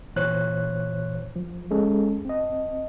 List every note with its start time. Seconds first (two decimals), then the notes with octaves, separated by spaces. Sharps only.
0.16 A#2 E3 C5 C#5 F#6
1.36 F3
1.71 G#3 C#4 G#4 A4
2.25 C4 D#5